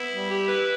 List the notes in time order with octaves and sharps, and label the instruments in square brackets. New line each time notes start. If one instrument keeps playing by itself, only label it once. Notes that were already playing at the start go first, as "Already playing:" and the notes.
Already playing: [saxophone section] B3 [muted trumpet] E4
[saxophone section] G3
G4
B4